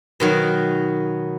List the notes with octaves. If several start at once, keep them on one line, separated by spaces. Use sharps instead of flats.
B2 D#3 F#3